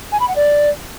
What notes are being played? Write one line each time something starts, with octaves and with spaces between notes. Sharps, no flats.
G#5
B5
F#5
D5